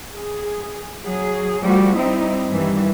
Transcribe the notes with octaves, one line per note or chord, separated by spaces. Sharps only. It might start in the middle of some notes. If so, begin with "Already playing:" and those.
G#4
F#3 G#4
F3 G3 A3 F#4
G3 C4 D#4 E4
G2 D#3 E3 G3